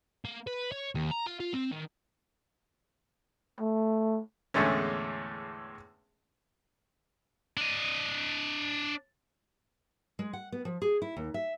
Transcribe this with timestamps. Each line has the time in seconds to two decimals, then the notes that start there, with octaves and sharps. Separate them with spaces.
0.25 A#3
0.47 B4
0.72 C#5
0.95 D#2
1.11 A#5
1.27 F4
1.40 F4
1.54 C4
1.72 D#3
3.60 A3
4.54 E2 A2 D3 G#3 A3 C#4
7.57 D4 D#5
10.19 G#3
10.33 F#5
10.52 B3
10.65 F3
10.82 G#4
11.02 E4
11.17 D#2
11.34 E5